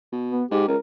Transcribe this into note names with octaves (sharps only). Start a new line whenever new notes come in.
B2
B3
G#2 G4
C#2 A#4